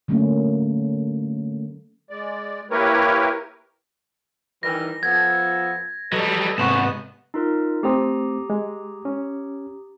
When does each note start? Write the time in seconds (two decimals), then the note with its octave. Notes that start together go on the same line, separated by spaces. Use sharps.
0.08 D3 F#3 A3 A#3 C#4
2.10 G#3 D5
2.71 A#3 E4 G4 A#4 B4 C#5
4.63 D#3 E3 G3 A#6
5.03 F3 B3 A4 G#6
6.12 F#3 G3 A4 B4 D#5
6.58 G#2 C3 B3 C#6 E7
7.34 D#4 F4 A#4
7.83 A3 C4 G4 A#5 D#6
8.50 G#3
9.05 C#4